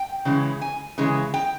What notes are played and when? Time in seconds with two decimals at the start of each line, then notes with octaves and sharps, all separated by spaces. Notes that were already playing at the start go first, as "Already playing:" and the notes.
Already playing: G5
0.25 C#3 E3 G#3
0.62 G#5
0.98 C#3 E3 G#3
1.34 G5